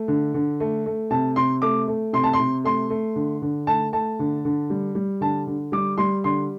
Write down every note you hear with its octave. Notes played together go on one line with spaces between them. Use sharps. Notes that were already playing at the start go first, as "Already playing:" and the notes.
Already playing: A3
D3
D3
A3
A3
C3 A5
C3 C6
A3 D6
A3
C3 C6
A5
C6
C3
A3 C6
A3
D3
D3
A3 A5
A3 A5
D3
D3
G3
G3
D3 A5
D3
G3 D6
G3 C6
D3 C6